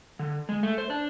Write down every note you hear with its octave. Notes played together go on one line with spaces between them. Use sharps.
D3
G#3
A3
C5
D4